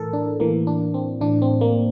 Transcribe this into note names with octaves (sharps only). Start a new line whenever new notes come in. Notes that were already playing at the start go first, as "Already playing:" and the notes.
Already playing: A2 E3 A4 A#4
D4
A2 E3 A#3
D4
C4
A2 E3 D4
C4
A#3